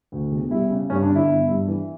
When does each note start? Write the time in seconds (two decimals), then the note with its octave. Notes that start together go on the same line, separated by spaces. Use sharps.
0.12 D2
0.31 E1
0.51 G3 E4
0.70 C#3
0.90 G2 C#4
1.03 D4
1.09 D3
1.15 E4
1.29 G1
1.49 G2
1.68 E3